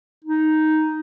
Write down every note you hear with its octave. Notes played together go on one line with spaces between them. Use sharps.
D#4